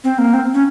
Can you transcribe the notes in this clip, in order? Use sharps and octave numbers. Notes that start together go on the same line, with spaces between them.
C4
A#3
C4
C#4